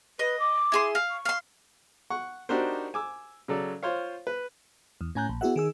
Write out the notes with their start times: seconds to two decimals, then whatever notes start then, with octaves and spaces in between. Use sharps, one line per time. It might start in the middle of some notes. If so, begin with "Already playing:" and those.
0.19 B4 D#5
0.40 D6
0.72 E4 G#4 C6
0.95 F5
1.10 C#6
1.25 F5 C6
2.10 F#5 C#6
2.49 D4 D#4 F#4 G4 A#4 C5
2.94 G#5 D6 E6
3.48 C#3 F#3 A4 D5
3.83 F4 C5 C#5 F5
4.27 B4
5.01 E2
5.15 A2 C#4 G#5 A#5 F#6 G6
5.29 A#1
5.41 B3 E4 F#4 G#4 E5 F#5
5.56 D#3 G#4 E6